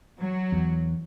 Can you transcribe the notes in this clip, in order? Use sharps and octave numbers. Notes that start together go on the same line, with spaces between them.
F#3
E2